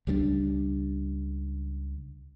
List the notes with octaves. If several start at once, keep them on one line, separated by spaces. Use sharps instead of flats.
C#2 G3 G#3 D4